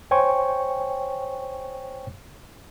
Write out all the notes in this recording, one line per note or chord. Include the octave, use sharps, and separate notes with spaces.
C5 C#5 G5 G#5 C6 C#6